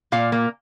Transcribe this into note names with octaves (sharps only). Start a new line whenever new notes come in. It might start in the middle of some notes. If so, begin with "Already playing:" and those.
A#2 F5
A#3